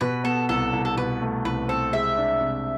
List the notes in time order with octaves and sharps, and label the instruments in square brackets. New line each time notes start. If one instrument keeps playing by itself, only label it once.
[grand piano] B2 [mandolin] B4
[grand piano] B3 [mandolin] A4
[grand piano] C2 [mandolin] A4
[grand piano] C2
[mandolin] A4
[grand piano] B2 [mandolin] B4
[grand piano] A3
[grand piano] C2 [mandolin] B4
[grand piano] C4 [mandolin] A4
[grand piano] G#3 [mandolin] E5
[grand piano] D4
C3